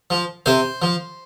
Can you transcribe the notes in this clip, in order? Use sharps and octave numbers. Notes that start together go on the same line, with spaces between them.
F3
C3 C5
F3